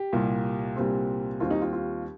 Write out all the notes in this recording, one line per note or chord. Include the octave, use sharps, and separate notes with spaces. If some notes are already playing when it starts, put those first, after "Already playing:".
Already playing: G4
C2 A#2 G3
C2 A#2 G3 C4
D#2 D#3 G3 C4 F4
D#4
F4
F4